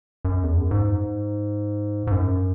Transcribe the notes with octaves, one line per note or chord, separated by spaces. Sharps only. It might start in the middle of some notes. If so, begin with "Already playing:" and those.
F#2
E2
F#2
G#2
G#2
F#2